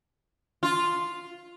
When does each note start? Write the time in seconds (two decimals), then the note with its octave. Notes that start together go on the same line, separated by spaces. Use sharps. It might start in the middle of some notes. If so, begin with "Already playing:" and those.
0.63 F4